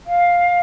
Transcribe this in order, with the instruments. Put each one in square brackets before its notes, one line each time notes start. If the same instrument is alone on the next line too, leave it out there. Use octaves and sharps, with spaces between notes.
[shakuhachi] F5